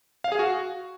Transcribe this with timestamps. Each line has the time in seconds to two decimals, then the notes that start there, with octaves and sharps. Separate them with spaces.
0.24 F5
0.32 G#4
0.39 F#4